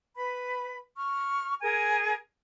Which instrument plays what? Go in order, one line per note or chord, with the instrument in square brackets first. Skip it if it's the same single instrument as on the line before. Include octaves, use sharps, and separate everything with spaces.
[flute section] B4 B5
C#6 F6
G#4 A#4 G#5